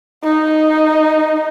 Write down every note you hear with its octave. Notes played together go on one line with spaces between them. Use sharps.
D#4